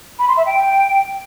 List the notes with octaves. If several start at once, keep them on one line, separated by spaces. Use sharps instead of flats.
B5
C6
E5
G5